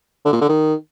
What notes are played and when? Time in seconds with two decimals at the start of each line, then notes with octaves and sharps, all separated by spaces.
0.25 D3
0.33 A#2
0.41 D3
0.49 D#3